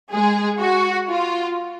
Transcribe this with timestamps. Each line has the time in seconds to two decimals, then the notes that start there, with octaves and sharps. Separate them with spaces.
0.12 G#3 G#4
0.61 F#4
1.10 F4